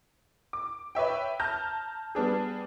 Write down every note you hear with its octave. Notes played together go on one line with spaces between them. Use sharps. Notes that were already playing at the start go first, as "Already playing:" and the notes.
D6
B4 C#5 E5 G5
A5 A#5 F6 G6 A#6
G3 B3 D4 G#4